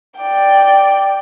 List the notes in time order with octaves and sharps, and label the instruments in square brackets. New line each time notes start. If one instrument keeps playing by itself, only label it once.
[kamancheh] D5 G5